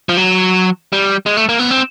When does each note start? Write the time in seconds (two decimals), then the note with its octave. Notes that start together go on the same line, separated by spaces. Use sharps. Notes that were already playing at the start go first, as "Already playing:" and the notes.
0.09 F3
0.17 F#3
0.93 G3
1.26 G#3
1.37 A3
1.49 A#3
1.59 B3
1.71 C4